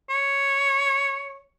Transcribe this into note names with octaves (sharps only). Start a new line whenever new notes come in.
C#5